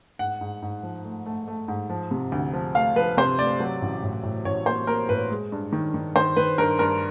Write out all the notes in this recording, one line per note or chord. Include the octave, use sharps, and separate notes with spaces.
G#2 F#5
G#2
G#2
F3
A3
A3
A3
G#2
F3
C3
D2
F3
A3 F5
F3 B4
C3 C5
A3 D5
F#3
A1
A2
A2
A1 C#5
A#3 C5
A#3 A#4
A2 B4
G#3
G2
D#3
D#3
D#3 C5
D#3 B4
G2 A#4
G2 A#4